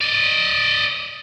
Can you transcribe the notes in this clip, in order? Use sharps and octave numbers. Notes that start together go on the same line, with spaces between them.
D5 D#5